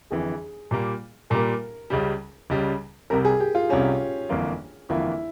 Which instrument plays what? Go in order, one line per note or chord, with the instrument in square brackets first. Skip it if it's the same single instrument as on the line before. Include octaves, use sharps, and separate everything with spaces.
[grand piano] G1 F2 E3 [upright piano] G#4
[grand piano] A#2 G3 A#3
[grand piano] A#2 G3 A#3 [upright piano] A#4
[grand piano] C#2 C#3 G3
C#2 C#3 G3
[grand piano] C2 C3 G3 [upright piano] A#4
[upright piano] G#4
G4
F4
[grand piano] C2 C3 G3 [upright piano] C#4
[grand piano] G1 F2 E3 A#3 F4
[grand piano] G1 F2 E3 A#3 F4 [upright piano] E4